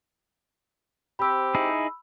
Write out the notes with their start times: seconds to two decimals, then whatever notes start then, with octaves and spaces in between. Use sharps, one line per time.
1.19 C4 G4 B5 E6
1.55 D#4 E4 G#4